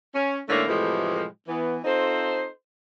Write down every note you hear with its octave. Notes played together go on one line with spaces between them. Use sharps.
C#4
G#2 D3 A3 A#3 E4 C#5
A2 C3 E3 F3 G#3 A3
E3 B3
C4 D#4 F4 A4 C5